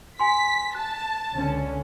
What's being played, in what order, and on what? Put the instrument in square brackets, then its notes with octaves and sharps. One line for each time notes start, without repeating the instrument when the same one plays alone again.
[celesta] G#5 C6 [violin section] B6
[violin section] A5 [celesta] F#6
[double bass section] C#2 D3 C#4